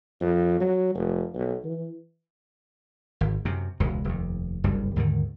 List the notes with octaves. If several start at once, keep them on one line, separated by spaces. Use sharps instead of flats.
F2
F#3
F1
B1
E3
G#1
F#2 C3
E1 C#2 G#3
F1 D#2
F#1 C2 G2
D#2 G#2 D3 D#3